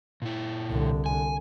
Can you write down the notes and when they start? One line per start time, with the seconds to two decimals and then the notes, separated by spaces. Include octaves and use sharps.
0.22 A#2 E4
0.70 C2 D3
1.06 G#5